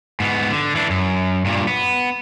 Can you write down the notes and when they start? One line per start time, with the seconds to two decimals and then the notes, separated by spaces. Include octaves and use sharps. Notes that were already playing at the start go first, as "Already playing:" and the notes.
0.20 G#2 B3
0.51 D3
0.76 E3 D4
0.90 F#2
1.45 G2 A#2
1.67 B3